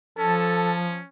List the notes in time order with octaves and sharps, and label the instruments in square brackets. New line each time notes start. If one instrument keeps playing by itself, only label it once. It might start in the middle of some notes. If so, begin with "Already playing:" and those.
[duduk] F3 [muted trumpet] C#4 [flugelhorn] A4 [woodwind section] A5